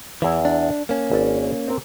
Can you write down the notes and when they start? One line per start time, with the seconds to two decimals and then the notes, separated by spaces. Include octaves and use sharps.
0.22 E2 E3 E4
0.45 D4
0.89 A#3 C#4 A5
1.11 G#1 D5
1.68 C4 A#4